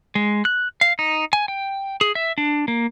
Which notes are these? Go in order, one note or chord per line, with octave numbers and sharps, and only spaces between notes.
G#3
F#6
F5
D#4
G#5
G5
G#4
E5
D4
A#3